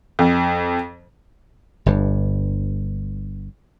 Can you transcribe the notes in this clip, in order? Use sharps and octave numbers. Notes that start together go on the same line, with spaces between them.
F2
G1 G2